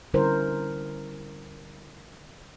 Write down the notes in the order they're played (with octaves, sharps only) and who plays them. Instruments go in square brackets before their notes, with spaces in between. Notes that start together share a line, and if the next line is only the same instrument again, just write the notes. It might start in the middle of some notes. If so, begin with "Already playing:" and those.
[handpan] D3 G3 C#4 E4 A#4 C5